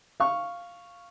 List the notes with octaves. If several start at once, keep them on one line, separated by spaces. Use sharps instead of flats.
F5 C#6